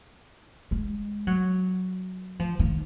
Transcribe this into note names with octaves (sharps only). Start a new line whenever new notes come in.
G#3
F#3
F3
D#3